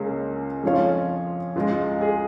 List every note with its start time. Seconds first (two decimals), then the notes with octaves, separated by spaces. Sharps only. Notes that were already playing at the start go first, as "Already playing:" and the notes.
Already playing: C#2 C#3 A#3 C#4 G#4
0.63 F2 F3 C#4 F4 C#5
1.56 C#2 C#3 G#3 F4
2.01 G#4